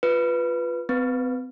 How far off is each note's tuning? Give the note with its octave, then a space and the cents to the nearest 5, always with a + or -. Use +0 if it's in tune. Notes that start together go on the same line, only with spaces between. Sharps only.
F4 +0 B4 +0
C4 -40 B4 +0